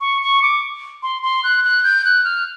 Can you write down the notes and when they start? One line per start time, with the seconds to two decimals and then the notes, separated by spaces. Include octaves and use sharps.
0.01 C#6
0.22 C#6
0.42 D6
1.03 C6
1.23 C6
1.44 F#6
1.64 F#6
1.84 G6
2.05 F#6
2.24 F6